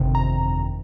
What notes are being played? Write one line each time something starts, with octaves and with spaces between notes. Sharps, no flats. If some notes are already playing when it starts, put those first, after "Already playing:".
Already playing: G1 F2 C3 D#3
A#5